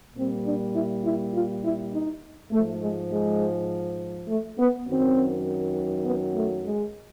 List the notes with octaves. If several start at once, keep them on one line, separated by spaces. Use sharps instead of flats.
A#2 G3 C4
D4
E4
E4
F4
E4
D#4
G#2 F3 A3
G#3
G#3
A3
B3
F#2 D#3 F#3 C4
B3
A3
G#3